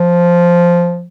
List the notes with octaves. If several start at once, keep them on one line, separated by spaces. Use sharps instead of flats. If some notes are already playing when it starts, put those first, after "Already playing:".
Already playing: F3